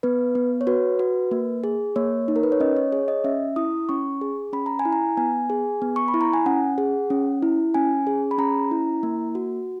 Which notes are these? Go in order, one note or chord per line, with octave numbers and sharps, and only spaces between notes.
B3 B4
B3
C#5
F#4 B4
F#4
A#3
G#4
A#3 C#5
D#4
A#4
B4
C#5
C#4 D#5
C#5
G#4 C#5
D#5
C#4 E5
E4 D#6
C#4 C#6
G#4
C#4 B5
A#5
G#5
E4
A#5
B3 G#5
G#4
B3
C#6
B5
E4
A#5
G#5
C#4 F#5
G#4
C#4
E4
C#4 G#5
G#4
B5
C#4 A#5
E4
A#3
F#4